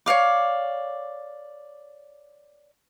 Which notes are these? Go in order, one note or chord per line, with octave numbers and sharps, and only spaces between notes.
C#5 D5 F5 D6